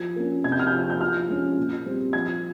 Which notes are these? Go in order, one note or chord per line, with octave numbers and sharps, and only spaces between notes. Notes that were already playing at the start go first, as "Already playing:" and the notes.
Already playing: F3 G#6
A#3 C#4
C3 G#6
G6
F6
G6
F3 C4
G6
F3 F6
G#3 C#4
A#2
G3 C4
F3 G#6